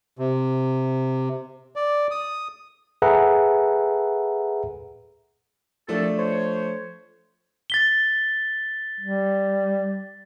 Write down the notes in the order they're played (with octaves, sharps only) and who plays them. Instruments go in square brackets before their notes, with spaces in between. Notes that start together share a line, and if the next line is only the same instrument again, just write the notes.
[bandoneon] C3
D5
D#6
[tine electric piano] G#4 A4 B4 E5 F#5 A#5
[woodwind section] C2 A4 [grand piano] F3 A3 D4
[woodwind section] C5 C#5
[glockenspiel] A6 B6 G7
[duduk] G3